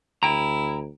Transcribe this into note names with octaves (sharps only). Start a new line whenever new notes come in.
D2 E4 G5 A#5